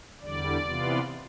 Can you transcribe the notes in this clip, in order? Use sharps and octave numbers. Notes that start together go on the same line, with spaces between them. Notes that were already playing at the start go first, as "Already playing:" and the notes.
E2 D3 G3 D5
C3 E3 B3 F4